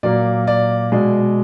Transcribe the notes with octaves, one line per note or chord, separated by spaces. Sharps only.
A#2 F#3 A#3 D5
D5
B2 G#3 D5